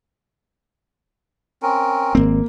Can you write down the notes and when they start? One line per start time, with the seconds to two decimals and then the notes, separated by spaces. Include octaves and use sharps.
1.62 C4 C#4 A#4
2.15 G#1 A#3 C4